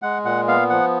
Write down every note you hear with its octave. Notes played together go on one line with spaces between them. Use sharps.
G#3 F#5
A#2 F#5
B3 F5
F3 F#5